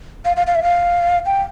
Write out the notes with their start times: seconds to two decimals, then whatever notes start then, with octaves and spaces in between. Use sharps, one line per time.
0.25 F5
0.37 F5
0.47 F5
0.55 E5
0.63 F5
1.26 G5